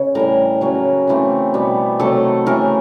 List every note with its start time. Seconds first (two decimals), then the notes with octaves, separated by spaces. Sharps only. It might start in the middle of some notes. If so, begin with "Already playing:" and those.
Already playing: C#3
0.15 A2 E3 G3 A#4
0.61 C#3 F#3 A#3 C#4
1.08 C#3 E3 A3 C4
1.54 B2 G3 B3
2.00 C3 D#3 F#3 A3 A4
2.46 C#3 E3 A3 A#4